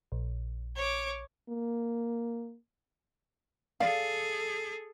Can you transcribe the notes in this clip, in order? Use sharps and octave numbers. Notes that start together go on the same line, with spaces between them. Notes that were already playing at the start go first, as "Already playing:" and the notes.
A#1
C#5 D6
A#3
G#4 A4 D5 F5